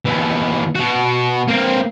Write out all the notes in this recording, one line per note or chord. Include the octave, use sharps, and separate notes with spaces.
D#2 E3
B2 F#4
A#3 C4